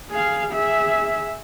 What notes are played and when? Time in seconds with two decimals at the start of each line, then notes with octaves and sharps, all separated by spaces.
0.11 G#4 F5
0.52 G#4 E5